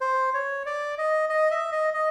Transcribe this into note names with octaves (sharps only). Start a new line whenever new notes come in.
C5
C#5
D5
D#5
D#5
E5
D#5
D#5